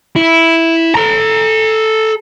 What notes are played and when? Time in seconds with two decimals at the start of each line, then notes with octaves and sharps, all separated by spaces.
0.16 E4
0.95 A4 A#5